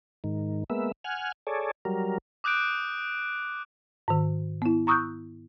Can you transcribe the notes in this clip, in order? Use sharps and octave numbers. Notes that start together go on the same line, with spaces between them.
G#2 D#3
G#3 A#3 B3 E5
F#5 G#5 F6
G#4 A4 C#5 D5
F#3 G3 A#4
D6 D#6 F#6 G6 D7
G#2 D#3
B3 E4
A#5 C#6 D#6 E6 F#6 G6